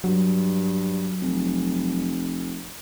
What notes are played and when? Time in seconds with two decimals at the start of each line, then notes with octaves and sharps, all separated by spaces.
0.04 G2 F#3
1.22 F1